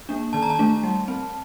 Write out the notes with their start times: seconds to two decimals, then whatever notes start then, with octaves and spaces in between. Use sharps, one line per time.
0.09 A#3 D4
0.33 D#3 A5
0.42 A#5
0.50 A5
0.59 A3 D4
0.84 G3
1.08 C4